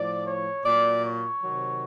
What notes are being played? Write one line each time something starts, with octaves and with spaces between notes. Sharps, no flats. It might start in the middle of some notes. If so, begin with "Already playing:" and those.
Already playing: A2 F3 D5
C#5
A#2 F#3 D5
C#5
C3 D#3 F#3